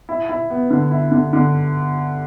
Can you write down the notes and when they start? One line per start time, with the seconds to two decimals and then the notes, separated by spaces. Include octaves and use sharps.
0.09 E4
0.29 E4
0.50 B3
0.70 D3
0.91 E4
1.12 D3
1.33 D3